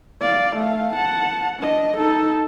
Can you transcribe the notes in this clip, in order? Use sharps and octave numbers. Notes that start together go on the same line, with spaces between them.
D5 F5
A3 F5
F#5 A5
D4 D#5
D#4 A4